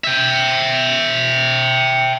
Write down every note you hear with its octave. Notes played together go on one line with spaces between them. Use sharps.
E5 G5